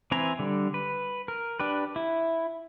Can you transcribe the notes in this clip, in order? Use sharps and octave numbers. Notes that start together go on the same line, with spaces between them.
E3 C4 B4 G#5 A#5
D3 G3
B4
A#4
D4 G4 B4
E4